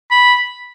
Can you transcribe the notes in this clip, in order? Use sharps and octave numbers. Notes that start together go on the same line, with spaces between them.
B5